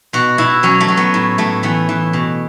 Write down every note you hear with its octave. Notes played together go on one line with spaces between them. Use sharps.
B2 F#4
B2 E4
F#3 C#4
A3
F#3
B3
A2
A2 A3
E3 B3
E3
B2